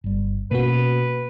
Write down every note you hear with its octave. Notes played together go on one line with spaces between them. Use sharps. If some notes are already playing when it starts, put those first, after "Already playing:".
G1 G3
B2 A#3 B3 C#4 F#4 B4